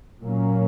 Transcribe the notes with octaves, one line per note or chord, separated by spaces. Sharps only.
A#2 F#3 A#3 C#4